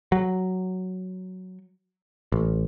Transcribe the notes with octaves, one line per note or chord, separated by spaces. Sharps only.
F#3
A1